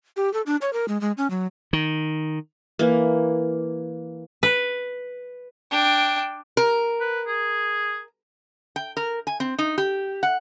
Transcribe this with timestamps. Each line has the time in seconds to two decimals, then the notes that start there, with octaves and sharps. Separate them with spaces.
0.17 G4
0.33 A4
0.46 D4
0.61 C#5
0.73 A#4
0.88 G#3
1.01 G#3
1.17 C#4
1.30 F#3
1.73 D#3
2.79 E3 A#3
4.43 B4
5.71 D4 G5
6.57 A#4
7.00 B4
7.27 G#4
8.76 G5
8.97 A#4
9.27 G#5
9.40 C4
9.59 D#4
9.78 G4
10.23 F#5